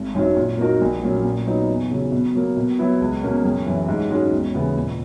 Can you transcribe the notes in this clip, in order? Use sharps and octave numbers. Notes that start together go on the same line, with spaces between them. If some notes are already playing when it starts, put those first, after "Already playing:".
Already playing: G#1
F#2 D#3 F#3
A#2
A#3 D#4 F#4 A#4
A#1
A#2 F#3 A#3 C#4
A#2
F#3 B3 D#4
E2
C#3 F#3
B2
F#3 A#3
B2
F#3 B3 E4
C#2
B2 A#3 C#4
F#1
F#2 E3
G#2
D#3 G#3 C#4 F#4
E1
D#2 C#3 E3 B3
A#2